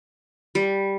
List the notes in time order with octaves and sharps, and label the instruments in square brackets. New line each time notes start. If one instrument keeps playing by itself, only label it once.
[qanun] G3